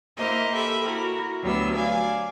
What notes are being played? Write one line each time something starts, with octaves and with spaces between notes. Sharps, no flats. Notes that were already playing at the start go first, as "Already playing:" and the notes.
A#3 E4 A#4 C5 D#5
G4 A4 E5 B5
E4 F#4 A#4
D2 F#3 G3 B3 E6
D5 F5 G#5